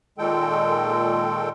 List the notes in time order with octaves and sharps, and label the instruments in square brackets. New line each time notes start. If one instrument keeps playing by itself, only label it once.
[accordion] A#2 D#3 G#3 A4 G5